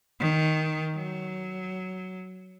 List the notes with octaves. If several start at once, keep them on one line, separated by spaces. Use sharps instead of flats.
D#3
F#3